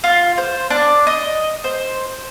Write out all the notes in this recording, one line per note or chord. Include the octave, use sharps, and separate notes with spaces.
F4
C5
D4
D#5
C5